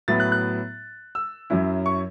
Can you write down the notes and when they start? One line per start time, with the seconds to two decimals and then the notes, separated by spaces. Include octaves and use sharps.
0.08 A2 F#3 B3 E4 A6
0.20 F#6
0.32 F#6
1.15 E6
1.50 F#2 F#3 C#4 E4
1.86 C#6